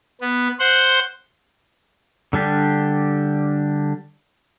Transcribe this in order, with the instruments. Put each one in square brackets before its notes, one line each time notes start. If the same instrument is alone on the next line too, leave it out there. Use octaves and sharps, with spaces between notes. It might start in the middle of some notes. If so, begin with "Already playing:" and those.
[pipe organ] B3
C5 F#5 C6
[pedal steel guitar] D3 G3 D4 G4